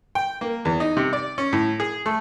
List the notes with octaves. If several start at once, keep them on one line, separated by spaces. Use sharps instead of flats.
G5
A#3
E2
D#4
C3
D5
C#4
A2
G#4
A3